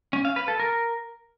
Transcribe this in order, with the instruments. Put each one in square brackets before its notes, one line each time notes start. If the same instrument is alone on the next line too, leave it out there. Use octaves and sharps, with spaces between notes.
[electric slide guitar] C#4
F5
B4
A4
A#4